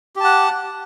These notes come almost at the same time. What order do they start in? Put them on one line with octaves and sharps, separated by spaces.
G4 A5 F#5